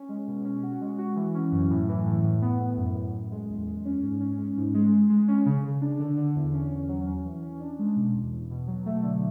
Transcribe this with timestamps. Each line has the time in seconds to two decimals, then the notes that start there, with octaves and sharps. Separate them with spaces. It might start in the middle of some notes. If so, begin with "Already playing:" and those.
Already playing: C#4
0.09 G#3
0.27 B2
0.45 C#4
0.63 F#4
0.81 G#3
0.98 F#4
1.16 E3
1.34 C#4
1.52 F#2
1.70 A2
1.89 E3
2.06 A2
2.24 A2
2.42 B3
2.60 A2
2.77 F#2
2.95 F#2
3.14 F#2
3.32 G#3
3.49 E2
3.67 G#3
3.85 C#4
4.03 G#2
4.20 C#4
4.38 G#3
4.57 G#2
4.74 G#3
4.92 G#3
5.10 G#3
5.28 C#4
5.46 C#3
5.64 C#3
5.82 D4
6.00 D3
6.18 D3
6.35 E2
6.53 C#4
6.72 C#4
6.88 F#3
7.07 C#4
7.25 E3
7.43 C#4
7.60 D4
7.79 G#3
7.96 B2
8.15 E2
8.32 E2
8.51 B2
8.67 F#3
8.86 A3
9.03 D3